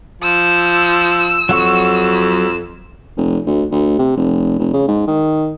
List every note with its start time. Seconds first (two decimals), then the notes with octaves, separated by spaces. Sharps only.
0.22 F3 E6
1.49 F2 F#3 F#5 C#6
3.17 F1
3.46 D2
3.71 D2
3.99 C3
4.17 F1
4.59 F1
4.73 C#3
4.88 G#2
5.07 D#3